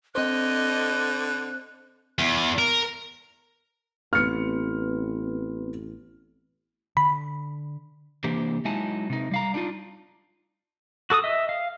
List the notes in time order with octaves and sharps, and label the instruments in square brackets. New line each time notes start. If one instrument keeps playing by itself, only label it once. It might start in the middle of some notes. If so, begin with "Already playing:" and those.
[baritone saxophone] D3 [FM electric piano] C4 C5 [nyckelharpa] D#5 [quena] F#6
[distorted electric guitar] E2
A#4
[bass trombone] A1 [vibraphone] B3 C4 B4 [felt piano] F6 C#7
[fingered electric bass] D3 [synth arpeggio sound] B5
[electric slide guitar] C3 E3 A#3 D4 G4 C5
F#3 G#3 D#4 E4 G#5 A5
C3 D#4
G3 F5 A#5
D4 D#4 F4
[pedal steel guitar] F#4 A4 D6 D#6
D#5 E5
F5